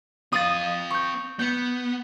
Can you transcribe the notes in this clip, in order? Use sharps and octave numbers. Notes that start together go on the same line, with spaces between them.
C4 F5 D#6 A6
C#6 G6
B3 G6 C#7